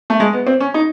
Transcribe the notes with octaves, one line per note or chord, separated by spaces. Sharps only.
A3
G#3
B3
C4
C#4
D#4